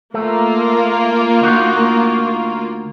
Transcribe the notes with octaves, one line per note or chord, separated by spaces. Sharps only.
A3 A#3 F4
D2 D#4 F#4